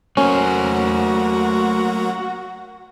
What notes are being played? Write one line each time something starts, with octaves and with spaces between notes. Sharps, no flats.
F#3 A3 A#3 C#4 F#4 A#4 C5